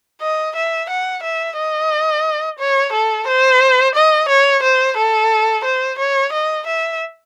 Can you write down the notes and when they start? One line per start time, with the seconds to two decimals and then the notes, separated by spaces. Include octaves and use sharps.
0.21 D#5
0.56 E5
0.89 F#5
1.23 E5
1.57 D#5
2.59 C#5
2.93 A4
3.27 C5
3.95 D#5
4.29 C#5
4.63 C5
4.98 A4
5.65 C5
5.99 C#5
6.33 D#5
6.67 E5